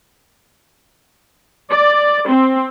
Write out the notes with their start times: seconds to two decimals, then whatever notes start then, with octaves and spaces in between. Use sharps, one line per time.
1.70 D5
2.27 C4